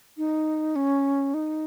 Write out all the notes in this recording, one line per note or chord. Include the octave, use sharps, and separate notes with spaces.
D#4
C#4
D#4